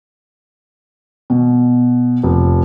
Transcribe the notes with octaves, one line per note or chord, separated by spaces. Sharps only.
B2
F1